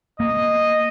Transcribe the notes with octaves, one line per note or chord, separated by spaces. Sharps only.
A#3 D#5